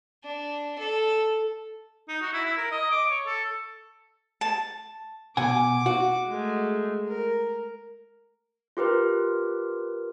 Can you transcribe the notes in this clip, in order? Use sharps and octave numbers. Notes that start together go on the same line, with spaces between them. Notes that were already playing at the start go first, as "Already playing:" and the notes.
D4
A4
D#4
F#4
E4
E4
A#4
D#5
D6
C#5
A4
A5
B2 F#5 G#5 D6
F#4
G#3 A3
A#4
F4 G4 A#4 B4